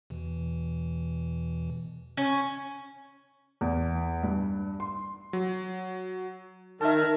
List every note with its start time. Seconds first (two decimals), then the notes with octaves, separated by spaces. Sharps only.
0.10 E2 B2 E3
2.17 C#4
3.61 E2
4.23 G2
4.80 C6
5.33 F#3
6.81 D#3 A#4 E5 A5